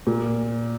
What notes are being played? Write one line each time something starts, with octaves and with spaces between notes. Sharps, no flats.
A#2